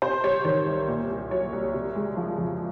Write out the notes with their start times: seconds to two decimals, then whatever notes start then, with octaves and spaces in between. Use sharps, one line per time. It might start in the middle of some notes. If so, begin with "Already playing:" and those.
0.02 C3 C5
0.24 G3 C#5
0.45 D#3 C#5
0.67 C2
0.88 A#2
1.10 C2
1.31 F#3 C#5
1.53 C2
1.74 C3
1.95 G#3
2.17 F3
2.38 F2